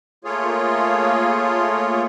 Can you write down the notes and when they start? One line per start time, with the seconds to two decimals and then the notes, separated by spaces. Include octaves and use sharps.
0.24 A3 A#3 F4 G#4 C#5